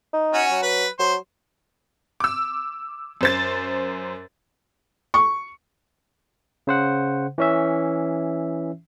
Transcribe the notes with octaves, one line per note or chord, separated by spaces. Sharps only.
D#4
C#4 F#4
F#3
B4
F#3 C5
D6 E6
F#2 C5 A6
C#6
C#3 C5 F#5
E3 C#4 E5